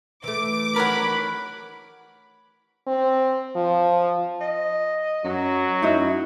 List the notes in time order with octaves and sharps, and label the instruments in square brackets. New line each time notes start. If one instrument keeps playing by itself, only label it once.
[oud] E3 A3 [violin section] D6
[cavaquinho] A#4 C#5 F#5 [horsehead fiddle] B5
[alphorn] C4
F3
[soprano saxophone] D#5
[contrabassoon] F#2 [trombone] F#3 [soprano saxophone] F#4
[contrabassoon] F#2 [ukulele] D#4 E4